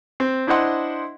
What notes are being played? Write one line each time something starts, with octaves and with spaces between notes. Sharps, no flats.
C4
D4 E4 C5 D#5 F#5 C6